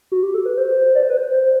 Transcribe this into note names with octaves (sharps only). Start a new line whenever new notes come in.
F#4
G4
A4
B4
C5
D5
C5
B4
C5
C5